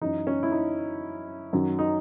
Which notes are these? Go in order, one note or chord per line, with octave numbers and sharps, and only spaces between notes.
F#2 E3 D#4
C#4
E4
D#4
F#2 D#3 F#3
D#4